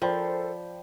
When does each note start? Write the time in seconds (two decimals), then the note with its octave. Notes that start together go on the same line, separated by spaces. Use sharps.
0.02 F3 A4 A#4 C5 D5 G5 B5